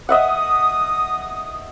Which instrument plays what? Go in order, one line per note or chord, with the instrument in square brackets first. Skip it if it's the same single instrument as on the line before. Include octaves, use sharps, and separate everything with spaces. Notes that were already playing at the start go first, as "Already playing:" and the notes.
[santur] D#5 E5 F#5 [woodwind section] D#6